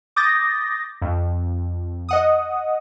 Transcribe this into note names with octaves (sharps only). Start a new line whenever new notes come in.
D6 D#6 G6 A6 A#6
F2
D#5 F#5 D#6